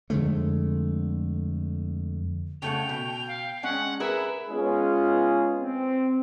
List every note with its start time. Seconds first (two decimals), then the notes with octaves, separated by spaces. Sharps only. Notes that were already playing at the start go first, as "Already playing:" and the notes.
0.10 F2 D3 G#3 A3
2.62 C#3 A3 F#5 G5 F7
2.89 B2
3.28 F5
3.63 G#3 C#4 F#5
4.00 G#4 A#4 B4 E5 B5
4.49 G#3 B3 C#4 F4 G#4
5.61 C4